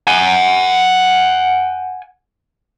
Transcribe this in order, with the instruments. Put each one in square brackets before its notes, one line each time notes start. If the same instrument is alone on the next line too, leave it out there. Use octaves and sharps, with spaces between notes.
[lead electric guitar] F#5 G#5